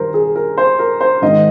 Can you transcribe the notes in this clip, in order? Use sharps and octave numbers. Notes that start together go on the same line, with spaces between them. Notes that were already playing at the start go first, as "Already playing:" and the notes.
Already playing: G2 D#3 A#4 C5
G#4
A#4
C5
A#4
C5
G#2 D#3 D#5